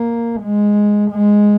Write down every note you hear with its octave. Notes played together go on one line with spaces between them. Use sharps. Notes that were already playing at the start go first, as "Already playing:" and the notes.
Already playing: A#3
G#3
G#3